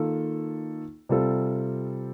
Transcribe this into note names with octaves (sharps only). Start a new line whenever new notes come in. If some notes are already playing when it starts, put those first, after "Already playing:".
Already playing: D#3 A#3 F4 A4
C3 G3 C4 F4 A4